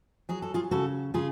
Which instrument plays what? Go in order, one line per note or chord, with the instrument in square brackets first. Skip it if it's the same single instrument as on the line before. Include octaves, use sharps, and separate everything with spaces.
[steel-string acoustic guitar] F#3 G#4
A4
F4 G#4
C#3 F#4 A4
C#3 F4 G#4